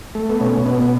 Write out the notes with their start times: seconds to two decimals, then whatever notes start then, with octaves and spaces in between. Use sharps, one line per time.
0.15 A3
0.29 B3
0.40 B2 C#4
0.66 B2 B3